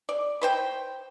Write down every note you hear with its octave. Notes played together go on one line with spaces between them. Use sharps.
D5
B4 C5 G5